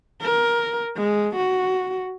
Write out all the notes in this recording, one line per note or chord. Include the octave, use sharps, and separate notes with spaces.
A#4
G#3
F#4